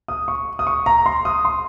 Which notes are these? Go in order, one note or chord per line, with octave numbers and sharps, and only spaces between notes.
D#6
C#6
D#6
C#6
A#5
C6
D#6
C6